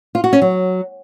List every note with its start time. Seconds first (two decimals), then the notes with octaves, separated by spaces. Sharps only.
0.15 F4
0.24 F#4
0.33 C#4
0.42 F#3